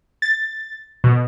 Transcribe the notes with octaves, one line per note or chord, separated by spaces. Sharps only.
A6
B2